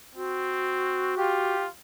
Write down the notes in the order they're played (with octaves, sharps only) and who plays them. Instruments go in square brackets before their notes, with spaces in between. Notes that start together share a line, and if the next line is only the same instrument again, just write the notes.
[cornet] C4 [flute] F#4
[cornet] F4 [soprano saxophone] G4